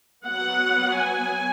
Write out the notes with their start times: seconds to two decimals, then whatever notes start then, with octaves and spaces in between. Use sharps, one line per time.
0.25 F#3 B3 F#5
0.98 G#5